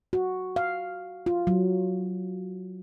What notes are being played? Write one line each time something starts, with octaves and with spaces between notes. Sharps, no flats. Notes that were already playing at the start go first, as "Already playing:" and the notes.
F#4
F5
F4
F#3